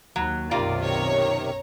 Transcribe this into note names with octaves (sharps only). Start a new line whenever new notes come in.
D#2 F#3
B1 F#2 C3 D#3 A#3 F4 D5
C#5 A#5